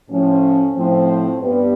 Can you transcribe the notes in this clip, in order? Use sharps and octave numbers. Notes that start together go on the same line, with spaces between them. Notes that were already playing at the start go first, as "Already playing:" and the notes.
A2 F3 C#4
A2 F3 C4
G2 B3